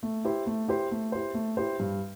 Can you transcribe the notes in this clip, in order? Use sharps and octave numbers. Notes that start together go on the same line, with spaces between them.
A3
E4 G4 C5
A3
E4 G4 C5
A3
E4 G4 C5
A3
E4 G4 C5
G2